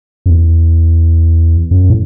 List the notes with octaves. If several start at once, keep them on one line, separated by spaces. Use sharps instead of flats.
F#2
E2
F#2
A2